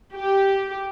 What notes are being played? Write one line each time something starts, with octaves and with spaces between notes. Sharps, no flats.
G4